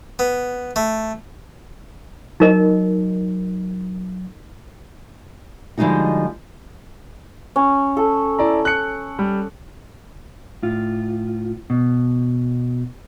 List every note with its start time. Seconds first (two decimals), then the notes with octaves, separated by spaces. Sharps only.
0.19 B3
0.76 A3
2.40 F#3 D#4 A#4 D#5
5.78 D3 F3 G3 G#3 D#4 F#4
7.56 C#4
7.97 A4
8.39 E4 D5 A#5
8.65 F#6 C#7
9.19 G3
10.63 A2 F4
11.70 B2